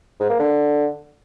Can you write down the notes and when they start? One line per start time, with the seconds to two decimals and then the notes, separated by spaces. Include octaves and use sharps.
0.20 G#2
0.29 A#3
0.39 D3